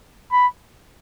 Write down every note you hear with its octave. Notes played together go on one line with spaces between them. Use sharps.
B5